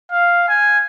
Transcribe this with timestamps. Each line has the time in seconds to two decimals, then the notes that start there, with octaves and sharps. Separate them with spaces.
0.11 F5
0.49 G#5